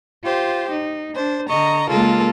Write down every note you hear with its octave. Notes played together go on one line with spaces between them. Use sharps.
F4 G4 C5
D#4
D4 C5
D3 D#5 A#5 C#6
C#3 G#3 A#3 F4 A4 A#4